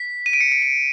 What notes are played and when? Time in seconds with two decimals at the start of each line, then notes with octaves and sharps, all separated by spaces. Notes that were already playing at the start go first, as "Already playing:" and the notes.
Already playing: B6
0.26 D#7
0.33 D7
0.41 C#7
0.52 D7
0.62 D7